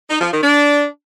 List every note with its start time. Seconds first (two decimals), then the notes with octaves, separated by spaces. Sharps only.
0.10 D#4
0.21 F3
0.32 D#3
0.43 D4